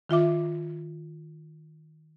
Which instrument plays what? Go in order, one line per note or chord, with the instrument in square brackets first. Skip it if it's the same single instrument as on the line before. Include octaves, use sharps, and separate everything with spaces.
[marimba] D#3 F4 E5 D6